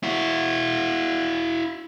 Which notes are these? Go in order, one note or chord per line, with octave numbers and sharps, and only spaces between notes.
E4 F#4